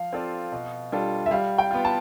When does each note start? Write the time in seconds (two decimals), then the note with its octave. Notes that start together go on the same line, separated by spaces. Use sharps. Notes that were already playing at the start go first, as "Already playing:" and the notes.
Already playing: F3 F5
0.13 C4 F4 A4 D5
0.52 B2
0.92 G3 D4 F4 A4
1.26 E5
1.31 G3 F5
1.58 G5
1.71 B3 F4
1.85 A5